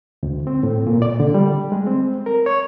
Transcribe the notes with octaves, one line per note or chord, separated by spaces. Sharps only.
D2
C4
A2
A#2
D5
D3
G3
G#3
C4
A#4
C#5